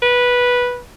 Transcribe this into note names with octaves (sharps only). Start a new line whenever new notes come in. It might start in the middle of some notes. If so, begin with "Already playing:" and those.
B4